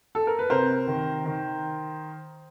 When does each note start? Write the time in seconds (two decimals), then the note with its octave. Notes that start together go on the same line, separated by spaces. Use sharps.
0.15 A4
0.27 A#4
0.39 B4
0.50 C3 A#4 C5
0.88 D#3
1.25 D#3